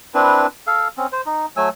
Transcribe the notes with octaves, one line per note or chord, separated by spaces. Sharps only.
C4 D4 E4 B4
A4 F5
C4 C#4
C5
D#4
F#3 A3 G#5 E6